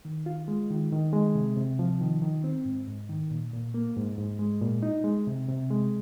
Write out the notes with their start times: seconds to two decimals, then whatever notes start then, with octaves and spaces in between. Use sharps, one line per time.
0.05 D#3
0.26 F4
0.48 G#3
0.70 D#3
0.92 D#3
1.13 G#3
1.35 C3
1.57 C3
1.79 F3
2.01 D#3
2.22 D#3
2.44 C4
2.65 G#2
2.88 G#2
3.09 D#3
3.31 A#2
3.53 A#2
3.74 A#3
3.96 G#2
4.18 G#2
4.39 G#3
4.61 A#2
4.83 D#4
5.04 G#3
5.27 C3
5.49 C3
5.71 G#3